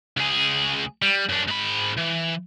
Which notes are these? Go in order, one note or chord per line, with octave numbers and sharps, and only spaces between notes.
C#2 G#4
G3
F#2 D4
G#2 B5
E3